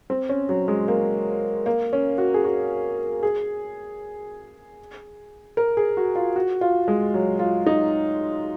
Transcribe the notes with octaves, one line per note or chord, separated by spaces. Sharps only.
C4
C#4
F#3
G#3
A#3
A#3
C#4
F#4
G#4
F#4
G#4
A#4
G#4
F#4
F4
F#4
F4
G#3
F#3
F4
D#4